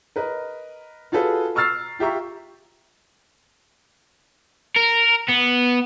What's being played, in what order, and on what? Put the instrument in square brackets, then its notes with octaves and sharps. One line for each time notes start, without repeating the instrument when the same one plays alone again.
[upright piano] A#4 B4 D#5
F4 F#4 G#4 A4 B4
A#5 C#6 E6 F6 A6 C7
F4 G4 E5 A#5 C#6
[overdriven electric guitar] A#4
B3